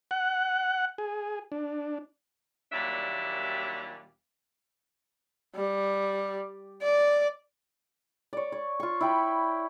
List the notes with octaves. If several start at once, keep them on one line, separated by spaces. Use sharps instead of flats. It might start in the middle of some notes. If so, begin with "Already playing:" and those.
F#5
G#4
D4
D#2 A#2 F#3 G3 D4 E5
G3
D5
C#5 D5
C#5
F4 C#6
E4 G5 B5